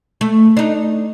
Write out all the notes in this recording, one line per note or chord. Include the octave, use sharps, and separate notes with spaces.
A3
D4 D#4